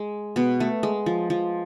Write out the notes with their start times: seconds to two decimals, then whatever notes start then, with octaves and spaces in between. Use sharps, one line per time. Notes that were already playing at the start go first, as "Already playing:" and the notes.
Already playing: G#3
0.36 B2 B3
0.60 A3
0.83 G#3
1.06 F3
1.30 F3